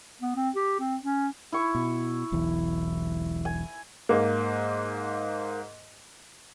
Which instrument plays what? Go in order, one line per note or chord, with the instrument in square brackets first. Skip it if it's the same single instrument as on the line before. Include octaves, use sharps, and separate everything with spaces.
[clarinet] B3
C4
G4
C4
C#4
[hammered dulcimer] E4 C#6
[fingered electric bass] B2
E1 B1 E3
[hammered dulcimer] G#5
[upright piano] G#2 A#3